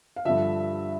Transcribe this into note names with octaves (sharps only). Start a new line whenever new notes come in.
F5
G2 D3 F3 E5